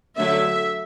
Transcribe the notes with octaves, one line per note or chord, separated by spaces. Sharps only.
D3 F#3 A3 E5